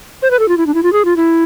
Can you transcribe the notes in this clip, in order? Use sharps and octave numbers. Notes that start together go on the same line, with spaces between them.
C5
B4
A4
F4
E4
D4
E4
F4
G#4
F4
E4